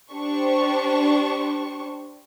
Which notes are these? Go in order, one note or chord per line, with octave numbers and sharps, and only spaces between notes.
D4 G4 C5 C#6